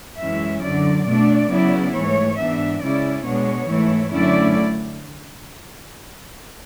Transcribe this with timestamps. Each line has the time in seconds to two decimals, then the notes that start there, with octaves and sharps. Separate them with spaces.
0.20 F#2 E3 G#3 C#4 E4 E5
0.63 F#2 D3 F#3 D5
1.07 B2 A3 D4 D5
1.51 C#3 F#3 B3 E4
1.94 G#2 E3 A3 C#5
2.38 G#2 E3 B3 D4 E5
2.82 C#3 G#3 C#4 E4 D5
3.26 B2 G#3 B3 D4 C#5
3.69 G#2 E3 A3 E4
4.13 F#2 D3 A3 C#4 E4 D5